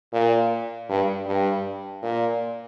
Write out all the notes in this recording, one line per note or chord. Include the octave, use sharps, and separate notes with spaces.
A#2
G2
G2
A#2